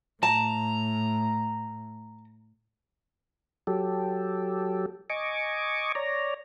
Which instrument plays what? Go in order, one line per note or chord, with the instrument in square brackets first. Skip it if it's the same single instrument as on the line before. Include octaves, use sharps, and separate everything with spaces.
[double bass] A2 [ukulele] A5 [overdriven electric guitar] A#5
[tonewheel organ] F#3 G4 A4
D#5 G#5 C#6 D6
C#5 D5 A#5